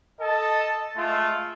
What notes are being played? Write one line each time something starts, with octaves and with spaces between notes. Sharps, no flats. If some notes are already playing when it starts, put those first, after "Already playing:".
A4 D#5 A5
G#3 A3 F4